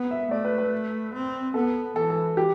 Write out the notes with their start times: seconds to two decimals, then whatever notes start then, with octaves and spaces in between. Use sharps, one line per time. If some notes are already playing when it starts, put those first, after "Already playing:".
Already playing: B3
0.11 E5
0.31 A3 D5
0.45 B4
0.58 B4
1.13 C4
1.54 B3 A4
1.96 E3 A4
2.10 A4
2.37 G4